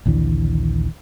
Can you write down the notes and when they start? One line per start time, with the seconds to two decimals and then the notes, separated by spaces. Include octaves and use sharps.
0.06 A#1 D#2 D3 E3